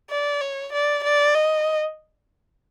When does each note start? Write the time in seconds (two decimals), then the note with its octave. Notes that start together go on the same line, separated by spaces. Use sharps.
0.10 D5
0.41 C#5
0.73 D5
1.04 D5
1.35 D#5